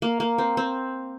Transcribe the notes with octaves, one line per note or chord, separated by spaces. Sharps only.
A#3
A#3
C4
C4